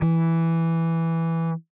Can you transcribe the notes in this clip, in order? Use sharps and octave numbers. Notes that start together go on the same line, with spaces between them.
E3